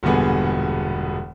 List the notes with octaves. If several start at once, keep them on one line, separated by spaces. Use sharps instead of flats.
E1 G2 A#2 D3 B3 G#4